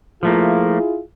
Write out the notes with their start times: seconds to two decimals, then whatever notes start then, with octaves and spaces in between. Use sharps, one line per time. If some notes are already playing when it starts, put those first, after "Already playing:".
0.23 F3 A3 A#3 E4 F4 G#4